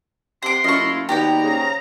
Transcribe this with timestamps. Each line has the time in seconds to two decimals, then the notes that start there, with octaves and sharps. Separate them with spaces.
0.43 C3 F#5 C6 D6
0.64 F#2 A3 E4 F4 D#5 C#6
0.79 F#1
1.09 D#2 B2 B3 G4 D5 G5 A#5
1.43 G#2 C#3